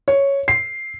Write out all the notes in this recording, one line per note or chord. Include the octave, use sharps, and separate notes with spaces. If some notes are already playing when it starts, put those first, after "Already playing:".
C#5
C7